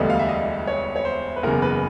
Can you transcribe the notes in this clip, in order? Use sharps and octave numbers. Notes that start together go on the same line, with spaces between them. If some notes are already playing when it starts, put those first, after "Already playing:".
Already playing: E1 D2 D3 G3 B3 D#5
F5
E5
D#5
C#5
C#5
C5
B4
F#1 E2 C#3 A#4
B4